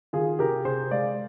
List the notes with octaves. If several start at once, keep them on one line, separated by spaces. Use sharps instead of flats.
D#3 F4 G#4
C3 G4 A#4
C3 G#4 C5
G#3 D5 F5